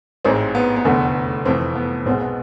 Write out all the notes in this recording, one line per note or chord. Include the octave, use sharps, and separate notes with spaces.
A1 G#2 G#3 C4
B3
B3
F1 E2 D3 A3
F1 F2 E3 A3 C4
B3
B1 B2 G#3 C4
B3